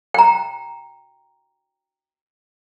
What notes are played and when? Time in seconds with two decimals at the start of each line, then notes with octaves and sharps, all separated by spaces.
0.14 G5 A#5